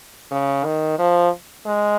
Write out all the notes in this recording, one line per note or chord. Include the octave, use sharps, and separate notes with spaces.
C#3
D#3
F3
G#3